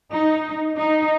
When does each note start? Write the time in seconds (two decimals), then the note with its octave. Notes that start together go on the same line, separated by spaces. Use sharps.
0.11 D#4
0.77 D#4